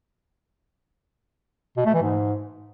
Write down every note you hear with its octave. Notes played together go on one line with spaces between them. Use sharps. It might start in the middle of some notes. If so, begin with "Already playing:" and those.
B2
A3
E3
G#2